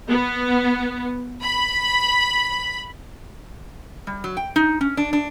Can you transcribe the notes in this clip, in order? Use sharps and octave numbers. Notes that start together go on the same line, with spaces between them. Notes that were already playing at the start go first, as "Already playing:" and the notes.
B3
B5
G3
F#3
G5
D#4
C#4
D4
D4